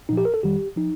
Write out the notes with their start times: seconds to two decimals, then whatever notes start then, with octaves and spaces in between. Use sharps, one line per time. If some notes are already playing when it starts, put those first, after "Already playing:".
0.09 A#2 F3 D#4
0.17 G4
0.25 A#4
0.34 A4
0.43 F2 D#3 G3 G4
0.76 F3 D#4